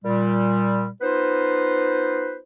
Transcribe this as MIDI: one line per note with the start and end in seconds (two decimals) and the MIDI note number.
0.05 0.87 46
0.05 0.87 55
1.02 2.37 59
1.02 2.37 63
1.02 2.37 65
1.02 2.37 71
1.02 2.37 72